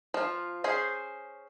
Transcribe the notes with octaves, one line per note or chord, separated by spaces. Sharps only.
F3 F4
C#4 G#4 C5